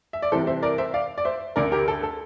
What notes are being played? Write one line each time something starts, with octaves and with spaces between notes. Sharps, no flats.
E5
D5
C2 C3 E3 A4 C5
C5 E5
A#4 D5
C5 E5
D5 F5
D5
C5 E5
D2 D3 A#4 D5
G4 A#4
A4
A4